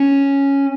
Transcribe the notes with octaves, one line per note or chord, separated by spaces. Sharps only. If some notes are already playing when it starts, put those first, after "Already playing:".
Already playing: C#4